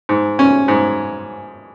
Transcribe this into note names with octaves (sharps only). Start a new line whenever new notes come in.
G#2
C#4
G#2